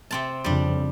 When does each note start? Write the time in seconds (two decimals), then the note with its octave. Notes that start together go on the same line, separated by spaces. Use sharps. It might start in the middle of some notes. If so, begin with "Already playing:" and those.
0.11 C3 C4 A5
0.44 F2 C#3 G3 D4